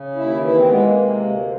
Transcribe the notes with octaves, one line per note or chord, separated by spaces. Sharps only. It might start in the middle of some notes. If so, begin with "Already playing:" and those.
Already playing: C#3
D#2 E4
E3 E4
C4
G#3 B3
A#3
C3
D2